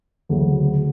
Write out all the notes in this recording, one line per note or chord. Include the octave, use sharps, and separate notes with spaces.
D2 C#3 F#3